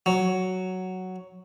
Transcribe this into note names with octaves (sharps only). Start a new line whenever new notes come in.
F#3